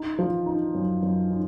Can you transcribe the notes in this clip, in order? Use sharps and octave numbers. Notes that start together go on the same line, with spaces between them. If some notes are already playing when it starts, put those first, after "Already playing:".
Already playing: D#4
F3
D#4
F#2
F#2
D#4